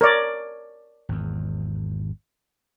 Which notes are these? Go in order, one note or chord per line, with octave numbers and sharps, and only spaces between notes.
A#4 C#5 D5
G#1 E2